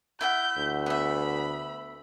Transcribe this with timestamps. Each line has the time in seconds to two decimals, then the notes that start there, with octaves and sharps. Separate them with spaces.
0.21 E4 E5 F#5 G6
0.57 D2
0.86 B3 E5 B5